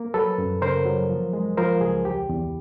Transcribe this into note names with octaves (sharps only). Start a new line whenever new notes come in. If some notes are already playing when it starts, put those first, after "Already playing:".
Already playing: A#3
F#3 A4 B4
F#2
C#3 A#4 C5
F#3
F3
G#3
F3 A#4 C5
C#2 G#4
E2 G4
E2